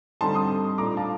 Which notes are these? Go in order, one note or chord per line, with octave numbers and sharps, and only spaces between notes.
D3 G3 C4 D#4 A5 C6
C6 D#6
A#2 A3 D4 A#5 D6
F5 A5